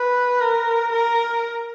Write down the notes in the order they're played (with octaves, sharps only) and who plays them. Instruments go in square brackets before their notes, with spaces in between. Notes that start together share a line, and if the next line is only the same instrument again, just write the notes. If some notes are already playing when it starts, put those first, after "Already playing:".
Already playing: [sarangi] B4
A#4
A#4